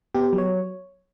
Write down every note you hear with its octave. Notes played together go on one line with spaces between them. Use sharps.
B3 G4
F#3
C#5